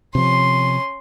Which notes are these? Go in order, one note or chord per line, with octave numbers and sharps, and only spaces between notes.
C3 F3 C#4 C6